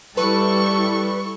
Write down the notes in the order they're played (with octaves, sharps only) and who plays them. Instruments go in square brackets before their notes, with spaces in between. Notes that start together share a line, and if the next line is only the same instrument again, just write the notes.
[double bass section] G3 [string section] E4 A4 C#6 [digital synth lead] B4